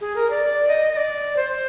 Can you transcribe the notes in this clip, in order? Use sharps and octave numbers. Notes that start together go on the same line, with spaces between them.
G#4
A#4
D5
D5
D#5
D#5
D5
C5